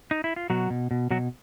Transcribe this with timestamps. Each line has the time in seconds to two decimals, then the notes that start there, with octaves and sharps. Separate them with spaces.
0.11 D#4
0.24 E4
0.36 F4
0.50 B2 F#3 F#4
0.70 B2
0.91 B2
1.11 B2 F#3 F#4